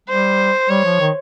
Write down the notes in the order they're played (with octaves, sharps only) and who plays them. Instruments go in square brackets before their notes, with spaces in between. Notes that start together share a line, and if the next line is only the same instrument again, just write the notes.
[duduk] G3 [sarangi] C5
[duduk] G3 [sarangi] C#5
[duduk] F3
D#3